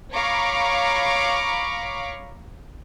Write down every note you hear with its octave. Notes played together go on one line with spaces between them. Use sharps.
C#5 F5 A#5 B5 C#6 D6